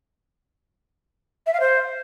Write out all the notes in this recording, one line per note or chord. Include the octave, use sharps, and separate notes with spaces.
E5
F5
C5